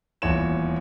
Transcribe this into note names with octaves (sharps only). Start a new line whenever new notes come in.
D#1 E2 C#5 E7